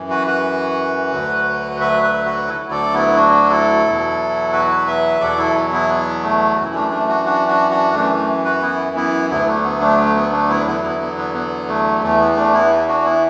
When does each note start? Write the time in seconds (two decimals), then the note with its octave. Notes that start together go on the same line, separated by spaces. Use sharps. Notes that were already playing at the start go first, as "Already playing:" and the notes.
Already playing: F#2 E3
0.10 F#4 B4
0.27 F#4 B4
1.12 D2 D3 F#3
1.80 B4 E5
2.03 B4 E5
2.26 F#4 B4
2.48 D2 D3 F#3 E4 A4
2.71 A4 D5
2.94 B3 E4
3.16 D4 F#4
3.50 E4 A4
3.85 E2 B2 F#3
4.53 F#4 B4
4.87 B4 E5
5.21 E2 B2 F#3 A4 D5
5.38 E4 A4
5.73 B3 E4
5.89 B3
6.23 A3
6.56 F#2 E3 F#4
6.65 E4
6.74 A3 D4
6.91 A3 D4
7.09 D4 F#4
7.25 D4 F#4
7.48 D4 F#4
7.71 D4 F#4
7.94 F#2 E3 A3 D4
8.10 A3
8.45 F#4 B4
8.62 B3 E4
8.96 B3 E4
9.30 D2 D3 F#3 B3 E4
9.46 A3 D4
9.64 B3
9.81 A3 D4
9.98 A3
10.15 B3
10.32 A3 D4
10.49 B3 E4
10.60 D4
10.66 E2 D3 F#3 B3 E4
10.83 B3 E4
11.01 B3
11.17 B3
11.35 B3
11.68 A3
12.03 E2 E3 A3
12.20 B3
12.36 A3 D4
12.53 B3 E4
12.88 D4 F#4
13.05 B3 E4